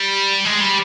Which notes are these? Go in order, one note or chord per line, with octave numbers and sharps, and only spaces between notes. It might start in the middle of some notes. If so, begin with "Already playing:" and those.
Already playing: G3
G#3
G3